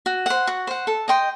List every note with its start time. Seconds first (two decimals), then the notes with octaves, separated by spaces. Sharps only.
0.06 F#4
0.26 C5 F#5
0.47 F#4
0.67 C5 F#5
0.87 A4
1.08 D#5 G5 C6